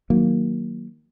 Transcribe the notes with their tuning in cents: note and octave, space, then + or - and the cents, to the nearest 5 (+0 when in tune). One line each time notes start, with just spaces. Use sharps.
D#3 +0 F#3 +0 A#3 +0